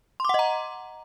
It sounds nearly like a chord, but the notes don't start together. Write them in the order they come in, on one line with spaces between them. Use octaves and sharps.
C6 D6 F#5 D#5 A#5